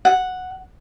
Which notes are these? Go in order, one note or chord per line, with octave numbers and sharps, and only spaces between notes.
F#5